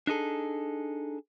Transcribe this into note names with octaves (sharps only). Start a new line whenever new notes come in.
D4 D#4 G#4 A4